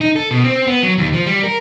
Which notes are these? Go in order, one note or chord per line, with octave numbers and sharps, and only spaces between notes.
D#4
A4
B2
C4
B3
F#3
D#2
F3
G3
A#4